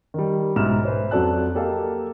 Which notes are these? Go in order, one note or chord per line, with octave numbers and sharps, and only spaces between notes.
D#3 G3
B1 G#2 E4 F6 E7
B4 C5
F2 F#3 A4 D5 A5 F#6
A#3 G4 A4 D#5 F5 A5